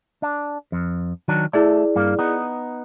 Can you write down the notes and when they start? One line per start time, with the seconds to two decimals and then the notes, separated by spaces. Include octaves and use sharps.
0.22 D4
0.72 F2
1.28 D#3 F#3 D4
1.53 A3 E4 G#4 D5
1.96 G2 A#3
2.19 B3 D#4